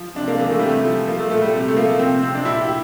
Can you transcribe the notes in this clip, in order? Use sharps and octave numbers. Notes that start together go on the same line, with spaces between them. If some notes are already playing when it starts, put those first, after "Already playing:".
Already playing: F3
C3 D4
A#3
E3 A#3
A3
C3 G3
A3
F3
F3 A#3
A3
A#2 A3
G3
C3
A3
F3 A#3
C3 C4
C3 C4
D4
A#2 E4
G4